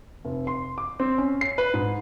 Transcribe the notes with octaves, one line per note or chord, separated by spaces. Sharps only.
F1
C6
D6
C4
C#4
C7
B4
G#2